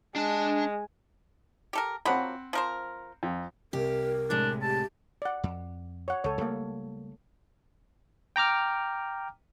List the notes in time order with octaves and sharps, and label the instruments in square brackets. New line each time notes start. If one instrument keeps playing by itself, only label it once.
[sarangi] G#3 [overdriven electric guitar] D4 A5
[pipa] G4 A4 A#4
[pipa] F3 F#3 A#3 [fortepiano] C4 F#5 B5
[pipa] F3 A#4 C5
[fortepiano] F2
[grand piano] C2 [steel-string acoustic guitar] G4 [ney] A#4
[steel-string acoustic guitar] A2 C3 G#3 [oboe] D4
[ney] G4 [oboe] A5
[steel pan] D5 F#5
[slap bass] F2
[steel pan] C#5 F#5
[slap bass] C#2 [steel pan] A4 C#5
[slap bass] C#2 G3 A3 [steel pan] A#3 A4
[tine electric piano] G5 A#5 D6 F6